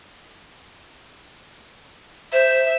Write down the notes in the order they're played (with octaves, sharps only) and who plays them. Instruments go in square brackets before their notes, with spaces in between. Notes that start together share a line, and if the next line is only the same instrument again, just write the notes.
[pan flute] C5 [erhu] E5